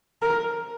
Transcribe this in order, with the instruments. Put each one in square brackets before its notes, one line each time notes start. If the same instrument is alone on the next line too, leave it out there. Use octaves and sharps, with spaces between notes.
[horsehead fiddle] A#4